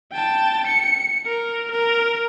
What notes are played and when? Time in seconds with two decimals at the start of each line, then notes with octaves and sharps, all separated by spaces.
0.12 G5 A5
0.67 C#7
1.26 A#4
1.72 A#4